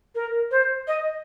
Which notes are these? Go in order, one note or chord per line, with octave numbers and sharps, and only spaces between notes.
A#4
C5
D#5